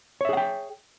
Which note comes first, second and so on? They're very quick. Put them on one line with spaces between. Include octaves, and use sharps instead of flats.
C#5 E5 G#4 F#5 G5